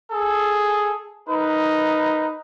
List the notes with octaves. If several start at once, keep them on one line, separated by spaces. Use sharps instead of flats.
G#4 A4
D#4 A#4 B4